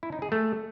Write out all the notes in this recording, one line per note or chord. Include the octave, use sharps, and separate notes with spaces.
E4
D#4
G#4
A3